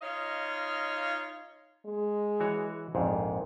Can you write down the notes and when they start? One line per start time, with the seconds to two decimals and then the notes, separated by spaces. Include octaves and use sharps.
0.02 D#4 F4 C#5 D#5 F5
1.86 G#3
2.40 E3 F#4 C#5
2.95 A#1 F2 G#2